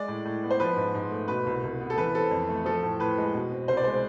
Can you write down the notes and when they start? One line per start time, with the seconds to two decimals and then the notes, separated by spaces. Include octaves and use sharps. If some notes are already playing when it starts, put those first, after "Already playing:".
Already playing: G#3 D5
0.08 A2
0.25 A2
0.43 B3
0.51 C5
0.60 F3 B4
0.76 G#2
0.94 G#2
1.11 A3
1.28 B2 B4
1.46 C2
1.63 C2
1.80 B3
1.90 A4
1.97 E3 B4
2.14 C4 A4
2.31 F2
2.48 A3
2.66 F3 A4
2.83 A2
3.00 A2 B4
3.18 G#3
3.34 B2
3.51 C4
3.68 C2 C5
3.77 D5
3.84 G#3 C5